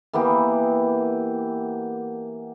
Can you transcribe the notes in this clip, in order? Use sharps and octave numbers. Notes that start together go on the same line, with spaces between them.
E3 A#3 B3 G4